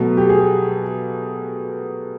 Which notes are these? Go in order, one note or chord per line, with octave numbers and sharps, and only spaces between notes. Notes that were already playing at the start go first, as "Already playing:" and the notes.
Already playing: B2 F#3 A3
G4
G#4